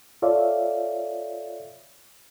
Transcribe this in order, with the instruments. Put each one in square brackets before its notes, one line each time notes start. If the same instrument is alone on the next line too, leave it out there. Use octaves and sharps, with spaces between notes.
[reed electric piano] F4 A4 C#5 D5 E5 F5